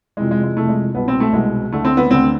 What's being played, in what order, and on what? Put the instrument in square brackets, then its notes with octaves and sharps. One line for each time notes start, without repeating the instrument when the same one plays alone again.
[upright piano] F2 C3 E3 G#3
G#3
G#3
F2 C3 E3 A3
G#3
C2 B2 B3
C4
A3
C2 B2 G#3
D2 D3 A3
C4
B3
D2 D3 C4